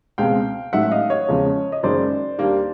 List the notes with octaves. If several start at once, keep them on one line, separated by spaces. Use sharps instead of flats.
C#2 B2 G#3 C4 F5 G5
A1 G#2 D#3 F#3 A3 E5 F#5
D#5 F5
C#5 D#5
E2 C#3 F3 G#3 C#4
D#5
F#1 F#2 D#3 G#3 C5 D5
D#2 D#3 G3 A#3 D4